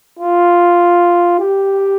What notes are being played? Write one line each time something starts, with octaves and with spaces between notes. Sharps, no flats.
F4
G4